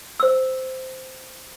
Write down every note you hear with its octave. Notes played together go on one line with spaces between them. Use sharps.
C5 E6